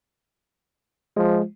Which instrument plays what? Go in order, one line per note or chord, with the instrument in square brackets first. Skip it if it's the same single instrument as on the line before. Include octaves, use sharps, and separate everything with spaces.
[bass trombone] F3 [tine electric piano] G#3